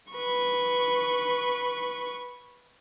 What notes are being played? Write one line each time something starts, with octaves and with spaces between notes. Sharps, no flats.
B4 C#6